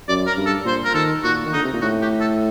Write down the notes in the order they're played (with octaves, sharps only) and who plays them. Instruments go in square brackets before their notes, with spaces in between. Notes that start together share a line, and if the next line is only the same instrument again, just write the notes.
[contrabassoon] F#2 [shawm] D5
[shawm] A#4
[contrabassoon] G2
[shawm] A4
[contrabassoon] A#2 [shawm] C5
[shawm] A#4
[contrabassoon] D#3 [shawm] A4
[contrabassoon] A#2 [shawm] F#4
[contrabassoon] D#3
[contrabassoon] D3 [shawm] D#4
[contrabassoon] C3
A#2
[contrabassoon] A2 [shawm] F#4
[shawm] G4
A4